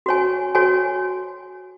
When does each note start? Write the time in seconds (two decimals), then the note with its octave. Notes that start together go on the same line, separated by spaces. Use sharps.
0.06 F#4 C#5 G#5
0.55 F#4 C#5 G#5